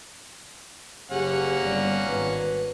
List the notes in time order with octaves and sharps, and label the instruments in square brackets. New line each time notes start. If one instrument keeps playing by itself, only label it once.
[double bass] F#1 [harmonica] A#3 C#4 F#5 [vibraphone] G4 G#4
[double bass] G1 [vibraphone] D5
[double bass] G#1 [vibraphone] B4